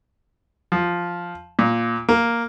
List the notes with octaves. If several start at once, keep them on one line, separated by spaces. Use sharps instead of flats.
F3
A#2
A#3